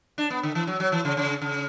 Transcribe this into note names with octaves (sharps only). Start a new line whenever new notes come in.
D4
B3
D3
E3
F#3
F#3
E3
C#3
C#3
C#3